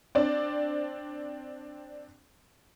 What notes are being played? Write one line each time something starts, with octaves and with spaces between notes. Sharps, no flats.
C4 D4 D5